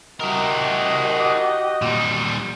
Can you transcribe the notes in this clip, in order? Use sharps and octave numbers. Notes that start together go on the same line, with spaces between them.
E4 F#4 G4 A#4 D#5
A#2 G3